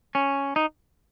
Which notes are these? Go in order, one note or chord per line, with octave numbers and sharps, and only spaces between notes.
C#4
D#4